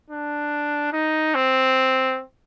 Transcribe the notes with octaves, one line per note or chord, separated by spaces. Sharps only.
D4
D#4
C4